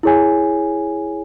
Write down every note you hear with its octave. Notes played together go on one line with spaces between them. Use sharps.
E4 G#4 C#5 G#5